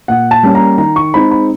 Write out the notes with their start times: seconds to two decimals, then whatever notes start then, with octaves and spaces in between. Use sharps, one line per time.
0.08 A#2 F#5
0.31 A5
0.43 G3 A#3 C#4
0.55 A#5
0.78 D#3 A#5
0.96 C#6
1.14 G#3 C4 D#4 B5
1.31 B5